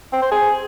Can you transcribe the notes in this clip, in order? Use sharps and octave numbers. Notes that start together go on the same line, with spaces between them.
C4
C5
G#4